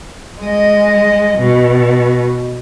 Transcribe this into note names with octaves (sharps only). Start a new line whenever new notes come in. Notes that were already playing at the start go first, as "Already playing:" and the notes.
G#3 D#5
B2